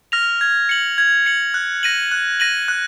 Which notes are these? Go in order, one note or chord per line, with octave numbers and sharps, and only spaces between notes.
F6 A#6 F7
G#6
C#7 F#7
G#6
C#7 F#7
F#6
A#6 D#7 F#7
F#6
A#6 D#7 F#7
F#6